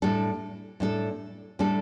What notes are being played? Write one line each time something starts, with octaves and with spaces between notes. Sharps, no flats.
A2 G3 D4 A4
A2 G3 D4 A4
A2 G3 D4 A4